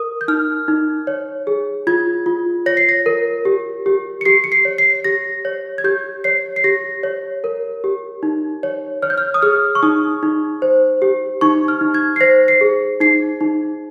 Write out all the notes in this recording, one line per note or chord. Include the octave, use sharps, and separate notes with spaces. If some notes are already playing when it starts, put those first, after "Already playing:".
Already playing: A#4 D#6
G6
D#4 F6
D#4
C#5
G#4
F4 G#6
F4
C#5 A#6
C7
A#6
A#4
G4
G4
C#7
G4 C7
C#7
C7
C#5
C7
G4 A#6
C#5
G#6
G4 G6
C#5 C7
C7
G4 A#6
C#5
A#4
G4
D#4
C#5
C#5 F6
G6
F6
D#6
G#4 F6
C#6
D#4 D#6
D#4
C5
G4
D#4 C#6
F6
D#4
G#6
C7
C5 A#6
C7
G#4
D#4 C7
D#4